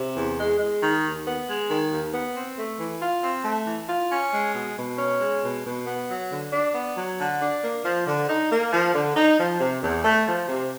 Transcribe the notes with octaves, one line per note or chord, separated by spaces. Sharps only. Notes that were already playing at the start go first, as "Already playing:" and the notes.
Already playing: C3
E2
G#3
G#3
D#3
D#2
B3
G#3
D#3
D#2
B3
C4
A3
E3
F4
C4
A3
E3
F4
C#4
G#3
B2
B2
C#4
G#3
B2
B2
B3
F#3
D3
D4
B3
F#3
D3
D4
A#3
F3
D3
D#4
A#3
F3
D3
D#4
F3
C3
E2
A3
F3
C3